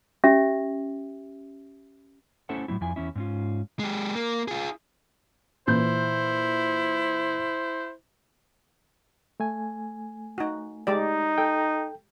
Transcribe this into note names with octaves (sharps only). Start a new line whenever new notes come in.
C#4 G4 E5
A3 C#4 E4 A4 C5 F#5
A2 F#3 C4 E4
F2 E4 G#5
E2 C#4 E4
G#2 C#4 F4
G#3 G4
A#3
F4 G#4
A#2 E3 E4 C5 G6
A3 G#5
D#4 F#4
G#3 D#4 G4 D5
A4 G5